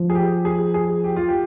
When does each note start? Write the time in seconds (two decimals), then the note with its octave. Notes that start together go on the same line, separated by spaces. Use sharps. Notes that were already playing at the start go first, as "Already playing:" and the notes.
Already playing: F3
0.10 G#4
0.15 G4
0.45 G#4
0.74 G#4
1.04 G4
1.16 F4
1.29 G4